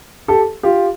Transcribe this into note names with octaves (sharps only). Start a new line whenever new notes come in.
G4 A4
F4 G4